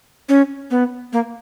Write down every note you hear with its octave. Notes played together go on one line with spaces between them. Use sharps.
C#4
B3
A#3